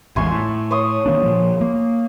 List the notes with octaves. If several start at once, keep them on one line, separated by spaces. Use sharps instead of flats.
A1 E2 G#2 G#5 C6 C#6
A2
C#5 C6 D#6
D#3 A#3 D4
A#2 F3
A#3